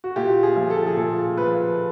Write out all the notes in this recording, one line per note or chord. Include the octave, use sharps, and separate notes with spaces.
F#4
A#2 G4
G#4
F3
A4
G#4
A#2 A4
F3 B4